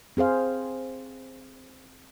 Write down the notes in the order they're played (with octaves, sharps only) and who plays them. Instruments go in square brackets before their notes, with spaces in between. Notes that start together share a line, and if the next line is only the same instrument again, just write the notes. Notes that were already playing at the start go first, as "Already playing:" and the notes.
[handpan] C4 G#4 C5 F5